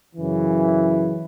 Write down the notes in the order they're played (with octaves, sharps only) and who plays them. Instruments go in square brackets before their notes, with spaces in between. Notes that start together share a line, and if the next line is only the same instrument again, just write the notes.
[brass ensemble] F#2 C#3 E3